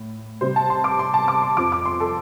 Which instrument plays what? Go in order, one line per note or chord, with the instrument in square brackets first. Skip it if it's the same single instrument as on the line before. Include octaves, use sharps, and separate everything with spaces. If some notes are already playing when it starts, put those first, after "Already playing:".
Already playing: [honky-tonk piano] A2
C3 G3 C4 C5
A5
C6
D6
C6
A5
D6
C6
F2 F3 C4 D6
D6
C6
A4